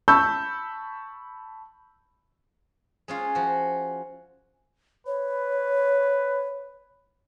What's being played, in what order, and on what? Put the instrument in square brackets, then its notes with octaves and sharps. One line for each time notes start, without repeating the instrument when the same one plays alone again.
[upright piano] A5 B5 C#6 E6 G6
[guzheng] G#3 C#4 F4
F3 F#4
[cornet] B4 [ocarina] C#5